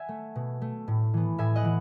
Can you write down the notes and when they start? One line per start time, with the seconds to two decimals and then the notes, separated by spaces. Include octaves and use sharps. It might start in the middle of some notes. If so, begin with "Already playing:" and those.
Already playing: E5 F#5 G#5
0.09 A3
0.36 B2
0.62 A3
0.88 A2
1.14 E3 B3
1.38 A2 E5 G#5
1.56 D#5 F#5
1.65 E3